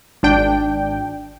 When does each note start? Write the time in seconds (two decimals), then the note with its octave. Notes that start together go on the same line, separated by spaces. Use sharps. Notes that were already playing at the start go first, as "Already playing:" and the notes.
0.23 G#1 D4 G5